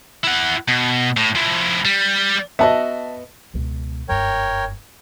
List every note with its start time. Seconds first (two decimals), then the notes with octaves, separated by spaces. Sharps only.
0.23 E4 F#5
0.68 B2
1.17 A2
1.35 F3 E4
1.85 G3
2.59 B3 F#4 D#5 E5 A5
3.54 C#2 B2
4.09 F#1 G2 A#4 C#5 G5